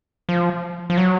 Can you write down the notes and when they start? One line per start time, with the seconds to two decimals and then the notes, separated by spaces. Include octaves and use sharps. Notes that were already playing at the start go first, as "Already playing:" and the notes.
0.29 F3
0.90 F3
0.97 F#3